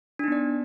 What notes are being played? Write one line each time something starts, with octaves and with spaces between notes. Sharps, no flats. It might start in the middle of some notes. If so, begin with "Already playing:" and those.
B3 D4 D#4 D5